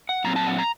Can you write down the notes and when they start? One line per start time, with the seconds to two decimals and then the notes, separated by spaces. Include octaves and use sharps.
0.09 F#5
0.24 A#2 F#3 C4 A#5
0.36 A5
0.47 F#5
0.59 A#5